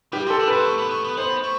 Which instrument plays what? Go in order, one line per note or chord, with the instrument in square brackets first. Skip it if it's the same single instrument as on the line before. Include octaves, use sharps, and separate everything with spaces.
[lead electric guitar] G3 [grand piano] G4
[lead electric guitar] F3 [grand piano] A4
[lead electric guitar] D4
[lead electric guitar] C4 [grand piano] B4
[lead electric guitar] A3
B3
A3
B3
[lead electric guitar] B3 [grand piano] C5
[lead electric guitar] A3